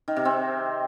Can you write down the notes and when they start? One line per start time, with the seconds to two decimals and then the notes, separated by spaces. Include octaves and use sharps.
0.08 D#3
0.16 C3
0.25 C4